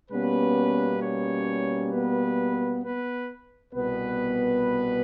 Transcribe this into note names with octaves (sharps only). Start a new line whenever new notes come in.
B2 G3 A#3 B3 C#4 B4
C#4 C#5
B3 B4
B3 B4
C2 B2 G3 B3 B4